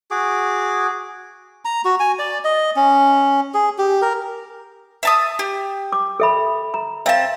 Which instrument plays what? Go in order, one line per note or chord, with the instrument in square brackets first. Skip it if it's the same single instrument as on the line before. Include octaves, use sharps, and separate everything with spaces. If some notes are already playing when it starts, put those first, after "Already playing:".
[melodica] F#4 G#4 D6
A#5
F#4
G#5
D5
D#5
C#4
G#4
G4
A#4
[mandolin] E5 A5 D#6
G4
[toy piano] D6
A4 E5 B5
A#5
[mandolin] C4 A5 [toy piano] E5 F5